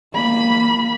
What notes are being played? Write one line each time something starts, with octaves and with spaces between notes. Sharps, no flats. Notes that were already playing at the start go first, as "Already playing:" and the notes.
A#3 B5